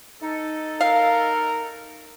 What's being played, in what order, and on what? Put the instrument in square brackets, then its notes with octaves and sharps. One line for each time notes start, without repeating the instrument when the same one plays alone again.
[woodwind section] D#4 A4
[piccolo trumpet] A#4 [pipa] F5